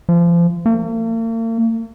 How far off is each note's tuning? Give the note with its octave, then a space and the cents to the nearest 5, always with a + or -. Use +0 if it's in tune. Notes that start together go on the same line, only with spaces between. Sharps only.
F3 -30
A#3 -45